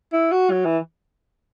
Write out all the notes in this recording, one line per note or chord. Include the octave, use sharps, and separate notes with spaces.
E4
F#4
F#3
E3